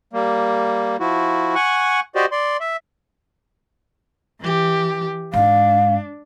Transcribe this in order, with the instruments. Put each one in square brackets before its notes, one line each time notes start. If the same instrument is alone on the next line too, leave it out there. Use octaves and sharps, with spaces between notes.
[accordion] G3 A#3
F3 E4 F#4
F#5 G#5 C#6 F#6
F#4 G4 C5 D5 D#5
D5 C6
E5
[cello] E3 G4
[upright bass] G#2 [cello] D4 [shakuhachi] F5